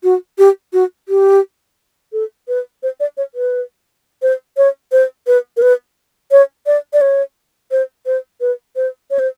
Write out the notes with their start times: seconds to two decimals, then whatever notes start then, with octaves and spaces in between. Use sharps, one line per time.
0.04 F#4
0.38 G4
0.73 F#4
1.09 G4
2.13 A4
2.48 B4
2.83 C5
3.00 D5
3.17 C#5
3.35 B4
4.22 C5
4.57 C#5
4.92 C5
5.27 B4
5.57 A#4
5.62 B4
6.31 C#5
6.66 D5
6.93 D5
7.01 C#5
7.71 C5
8.06 C5
8.41 B4
8.76 C5
9.10 C#5
9.19 C5